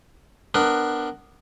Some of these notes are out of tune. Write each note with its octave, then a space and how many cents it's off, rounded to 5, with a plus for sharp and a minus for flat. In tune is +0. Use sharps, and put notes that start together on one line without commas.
B3 +10 D4 +15 A#4 +0